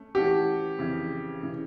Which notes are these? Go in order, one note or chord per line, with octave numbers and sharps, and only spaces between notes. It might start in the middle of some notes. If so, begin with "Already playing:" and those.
Already playing: A3 C#4
E3 A3 C#4 F#4 G4
F2 C#3 E3
C#3 E3